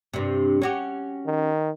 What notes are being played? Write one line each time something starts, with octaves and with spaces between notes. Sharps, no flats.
G2 C3
C#4 F#4 G4
D#3